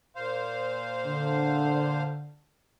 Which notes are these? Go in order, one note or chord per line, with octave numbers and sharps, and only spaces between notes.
A#2 C5 F5
D3